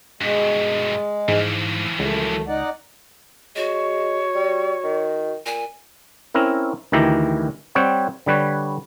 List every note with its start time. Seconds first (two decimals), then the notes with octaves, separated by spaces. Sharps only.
0.21 G2 B2 G#3
1.28 G#2 E3 F3
1.99 C#2 F#2 A3
2.47 D#4 D5 F#5
3.56 G#3 F#4 C#5
4.35 G3
4.84 D#3
5.46 A#2 G#5
6.34 C4 C#4 E4 A#4
6.92 D2 D#3 E3 E4 G4 A#5
7.75 G3 C4 C#5 F#5 G5
8.26 D3 G3 B4 C#5